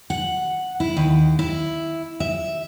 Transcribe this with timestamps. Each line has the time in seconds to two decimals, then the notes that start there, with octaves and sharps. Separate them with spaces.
0.10 F#5
0.80 E4
0.97 D#2
1.39 E4
2.20 E5